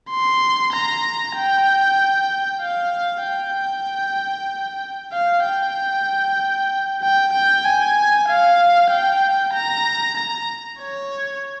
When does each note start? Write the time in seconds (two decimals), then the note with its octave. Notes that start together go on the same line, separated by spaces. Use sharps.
0.10 C6
0.73 A#5
1.36 G5
2.62 F5
3.24 G5
5.13 F5
5.45 G5
7.02 G5
7.33 G5
7.65 G#5
8.28 F5
8.91 G5
9.54 A#5
10.17 A#5
10.80 C#5